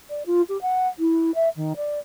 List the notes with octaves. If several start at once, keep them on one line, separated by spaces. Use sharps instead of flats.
D5
F4
G4
F#5
E4
E5
D#3
D5